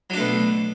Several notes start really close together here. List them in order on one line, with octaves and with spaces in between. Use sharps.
F#3 D4 A3 B2